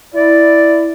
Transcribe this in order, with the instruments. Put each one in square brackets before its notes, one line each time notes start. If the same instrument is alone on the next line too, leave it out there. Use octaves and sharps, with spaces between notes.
[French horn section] E4 [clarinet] D5